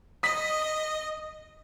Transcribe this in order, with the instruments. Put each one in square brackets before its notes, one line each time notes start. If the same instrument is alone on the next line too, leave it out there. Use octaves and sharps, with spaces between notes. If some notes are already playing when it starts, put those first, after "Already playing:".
[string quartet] D#5 [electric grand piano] D#6 B6